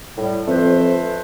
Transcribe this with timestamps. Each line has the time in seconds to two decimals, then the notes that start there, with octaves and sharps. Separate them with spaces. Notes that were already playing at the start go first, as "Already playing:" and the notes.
0.16 A2 G3
0.47 F2 A3 B4 C5